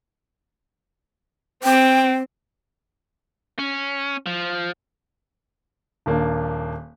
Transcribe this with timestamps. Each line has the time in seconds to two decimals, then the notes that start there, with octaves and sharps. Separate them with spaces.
1.64 C4 G5
3.59 C#4
4.26 F3
6.06 D#1 A#3 D4